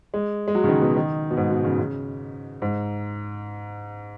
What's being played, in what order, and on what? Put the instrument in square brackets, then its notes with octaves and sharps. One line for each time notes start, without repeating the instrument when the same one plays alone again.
[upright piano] G#3
G#3
F#3
C#3
D#3
B2
D#3
B2
G#2
B2
C#3
C#3
G#2